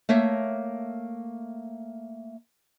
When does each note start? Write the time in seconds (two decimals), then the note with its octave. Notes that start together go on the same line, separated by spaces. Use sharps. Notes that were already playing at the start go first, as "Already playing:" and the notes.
0.09 A3 A#3 C#5 E5